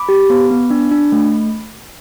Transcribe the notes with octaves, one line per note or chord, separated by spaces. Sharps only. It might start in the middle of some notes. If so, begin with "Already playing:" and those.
Already playing: B5 D6
G4
B3
B3
D4
D4
A3